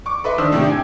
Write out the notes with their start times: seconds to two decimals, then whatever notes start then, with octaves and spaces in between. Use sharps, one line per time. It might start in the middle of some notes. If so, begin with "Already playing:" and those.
0.06 C#6 D6
0.24 A4 B4 D#5 E5 C6
0.38 D#3 D4 C5 D#6 E6
0.52 A2 C3 D#3 D4 E4 G4
0.68 G5 G#5 G#6